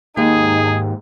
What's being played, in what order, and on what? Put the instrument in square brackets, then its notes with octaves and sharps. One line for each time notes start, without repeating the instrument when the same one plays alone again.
[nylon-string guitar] D#2 [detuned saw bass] G#2 [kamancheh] D#4 [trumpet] G#4